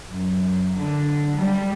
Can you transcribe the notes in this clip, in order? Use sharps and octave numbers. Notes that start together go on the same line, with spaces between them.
F#2
D3
G3